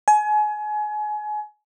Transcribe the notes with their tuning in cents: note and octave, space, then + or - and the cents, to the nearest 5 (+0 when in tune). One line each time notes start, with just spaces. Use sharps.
G#5 +30